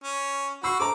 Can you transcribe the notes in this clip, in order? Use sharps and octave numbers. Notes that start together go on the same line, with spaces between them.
C#4
F#4 B5 E6 C7
A4 C5 A#5 D6